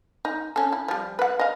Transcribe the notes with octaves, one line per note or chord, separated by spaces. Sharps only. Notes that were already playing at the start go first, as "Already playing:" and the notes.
D#4
C#4 A4
E4
F3 G3
B4 F#5
D#5 F5